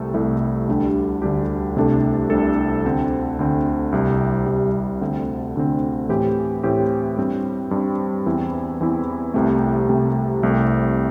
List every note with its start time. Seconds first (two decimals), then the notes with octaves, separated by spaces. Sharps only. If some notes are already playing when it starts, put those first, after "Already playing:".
Already playing: C2 C3 A3 A4
0.14 C2 C3 A3 E4 A4
0.67 D2 D3 G3 D4 G4
1.22 D2 D3 G3 D4 G4
1.76 C2 C3 A3 D4 A4
2.30 C2 C3 A3 D4 A4
2.84 D2 D3 C4
3.39 D2 D3 C4
3.92 C2 C3 G3
4.46 C2 C3 G3
5.01 D2 D3 C4
5.55 D2 D3 C4
6.09 A2 E3 C4 G4
6.63 A2 E3 C4 G4
7.17 G2 G3 C4
7.71 G2 G3 C4
8.26 E2 E3 C4 E4
8.81 E2 E3 C4 E4
9.34 C2 C3 A3
9.88 C2 C3 A3
10.43 C2 C3 A3 C4